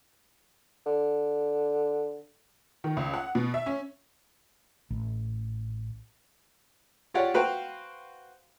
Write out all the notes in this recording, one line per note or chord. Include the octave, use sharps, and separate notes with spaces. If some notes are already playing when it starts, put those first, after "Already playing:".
D3
D#3
C#2
F#5
B2
E5
C#4
A1
F4 G4 C#5 D5 F#5
F#4 B4 C5 F5 G5